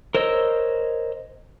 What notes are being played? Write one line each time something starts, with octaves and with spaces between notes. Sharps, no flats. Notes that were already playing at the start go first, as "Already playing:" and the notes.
A#4 C5 C#5 D#5 E6